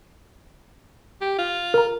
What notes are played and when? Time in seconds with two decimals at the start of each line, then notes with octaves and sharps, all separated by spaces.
1.21 G4
1.39 F4
1.74 A#4 A#5